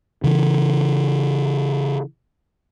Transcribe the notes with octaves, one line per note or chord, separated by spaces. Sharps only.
C#3 E3